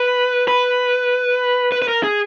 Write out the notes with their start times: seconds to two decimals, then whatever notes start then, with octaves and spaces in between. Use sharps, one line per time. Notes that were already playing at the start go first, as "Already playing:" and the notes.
Already playing: B4
0.48 B4
1.72 B4
1.82 B4
1.88 A#4
2.03 G#4